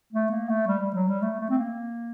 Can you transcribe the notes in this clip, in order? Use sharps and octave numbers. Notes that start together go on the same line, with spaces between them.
A3
A#3
A3
G3
G3
F#3
G3
A3
A3
C4
A#3